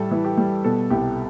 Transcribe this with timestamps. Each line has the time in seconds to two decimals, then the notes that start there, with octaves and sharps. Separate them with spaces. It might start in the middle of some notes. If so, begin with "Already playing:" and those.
Already playing: A2 G3 A4
0.11 E3
0.25 G4
0.37 G3
0.64 B2 A4
0.90 C2 G4